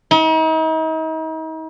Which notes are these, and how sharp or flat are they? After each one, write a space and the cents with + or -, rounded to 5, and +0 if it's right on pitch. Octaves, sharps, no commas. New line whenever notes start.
D#4 +40